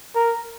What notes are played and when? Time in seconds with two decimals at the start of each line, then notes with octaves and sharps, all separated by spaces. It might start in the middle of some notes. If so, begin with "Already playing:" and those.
0.15 A#4